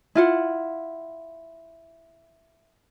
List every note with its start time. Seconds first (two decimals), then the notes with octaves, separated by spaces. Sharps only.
0.15 E4 F4 F#5